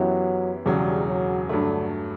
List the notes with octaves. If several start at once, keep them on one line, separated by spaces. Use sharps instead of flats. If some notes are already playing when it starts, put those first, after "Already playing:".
Already playing: F#2 E3 F#3 B3 E4 G4
E1 E2 C#3 F#3 G3
F#3
G2 D3 F#3 A3